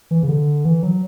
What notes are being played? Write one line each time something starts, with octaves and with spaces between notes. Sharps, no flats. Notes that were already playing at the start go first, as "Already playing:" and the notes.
E3
C#3
D3
E3
F#3